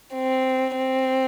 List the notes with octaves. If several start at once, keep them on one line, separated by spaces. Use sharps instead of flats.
C4
C4